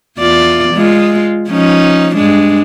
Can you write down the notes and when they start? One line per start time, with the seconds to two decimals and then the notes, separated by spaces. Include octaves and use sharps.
0.19 E2 F4 D5
0.74 G#3 F4
1.48 F3 C#4 D#4
2.16 G2 G#3 D4